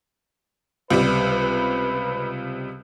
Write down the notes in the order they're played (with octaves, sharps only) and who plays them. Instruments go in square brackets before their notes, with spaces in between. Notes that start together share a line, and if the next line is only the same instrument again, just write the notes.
[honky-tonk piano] C#2 C3 G3 [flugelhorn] B4